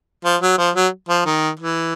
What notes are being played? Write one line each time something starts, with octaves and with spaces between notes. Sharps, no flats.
F3
F#3
F3
F#3
F3
D#3
E3